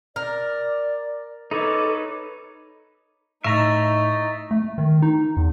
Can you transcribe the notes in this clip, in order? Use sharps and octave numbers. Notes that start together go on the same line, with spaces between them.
A#4 D5
D#4 A4 B4 C#5 D6
A2 D#4 E5 A#5 C#6 A6
A3
D#3
D#4
E2